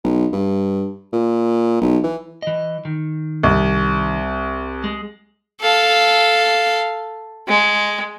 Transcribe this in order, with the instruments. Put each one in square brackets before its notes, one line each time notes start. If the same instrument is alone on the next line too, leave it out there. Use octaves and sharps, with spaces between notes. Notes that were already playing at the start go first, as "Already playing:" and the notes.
[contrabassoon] B1
G2
A#2
B1
E3
[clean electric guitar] E3 D#5
D#3
[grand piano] C2
[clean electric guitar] G#3
[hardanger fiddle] A4 F5
G#3